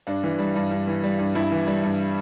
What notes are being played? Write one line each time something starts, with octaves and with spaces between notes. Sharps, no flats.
G2 D4
E3
G3
G2
G2
E3
G3
G2
G2 E4
E3
G3
G2